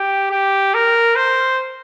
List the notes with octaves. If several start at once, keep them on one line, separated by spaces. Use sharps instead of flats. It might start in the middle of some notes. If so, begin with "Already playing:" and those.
Already playing: G4
G4
A#4
C5